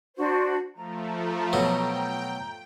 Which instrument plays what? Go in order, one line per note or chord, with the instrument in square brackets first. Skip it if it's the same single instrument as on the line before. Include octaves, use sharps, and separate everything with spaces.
[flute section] D4 F#4 C5
[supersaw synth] F3 A3 [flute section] A#5
[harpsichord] B2 F#3 [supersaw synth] G5